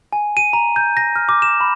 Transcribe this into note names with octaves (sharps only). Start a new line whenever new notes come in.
G#5
D#7
A#5
G6
A#6
F6
D6
E7
B5